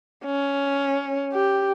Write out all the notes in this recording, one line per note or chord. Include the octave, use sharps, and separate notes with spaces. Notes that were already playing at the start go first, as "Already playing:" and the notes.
C#4
G4